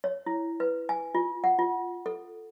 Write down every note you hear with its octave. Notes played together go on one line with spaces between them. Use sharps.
C#5
E4
B4
G#5
F4
F#5
F4
A4